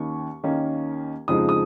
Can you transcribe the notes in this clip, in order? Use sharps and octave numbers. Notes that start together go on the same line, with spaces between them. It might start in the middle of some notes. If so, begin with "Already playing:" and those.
Already playing: D#2 D#3 A#3 C#4 C#6
D#2 D#3 A#3 C#4
F2 C#3 F3 G#3 D#4 D#6
D#6